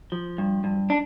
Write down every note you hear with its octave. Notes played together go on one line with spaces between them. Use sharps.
F3
G2
G2
D4